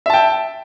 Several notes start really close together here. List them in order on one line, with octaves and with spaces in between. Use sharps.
E5 A5 G5